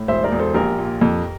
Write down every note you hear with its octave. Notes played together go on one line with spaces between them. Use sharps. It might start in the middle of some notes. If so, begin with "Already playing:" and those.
Already playing: A2
E1 C5 E5
A#4 D5
E1
A4 C5
A#1 G4 A#4
A#2
F2